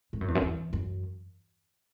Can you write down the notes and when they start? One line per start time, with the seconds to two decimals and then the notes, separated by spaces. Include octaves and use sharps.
0.13 G#2
0.21 F#2
0.28 E2
0.35 F#2
0.42 E2
0.73 F#2